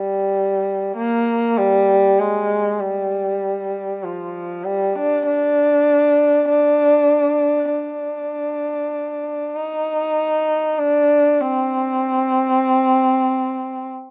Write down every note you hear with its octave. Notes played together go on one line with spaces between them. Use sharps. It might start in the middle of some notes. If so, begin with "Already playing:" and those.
Already playing: G3
A#3
G3
G#3
G3
F3
G3
D4
D4
D4
D4
D#4
D4
C4